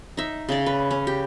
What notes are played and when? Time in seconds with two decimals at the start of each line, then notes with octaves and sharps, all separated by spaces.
0.17 D#4 E5
0.49 C#3 D5
0.66 B4
0.91 C#4
1.07 G4